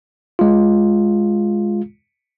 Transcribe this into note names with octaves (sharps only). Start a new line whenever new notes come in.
G#3 F4